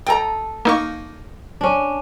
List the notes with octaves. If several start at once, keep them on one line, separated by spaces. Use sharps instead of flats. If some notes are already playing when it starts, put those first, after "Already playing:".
A4 D#5 G5 A#5
A#3 D#4 C#6
C#4 D4